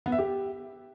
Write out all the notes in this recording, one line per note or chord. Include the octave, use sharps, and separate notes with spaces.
B3
E5
G4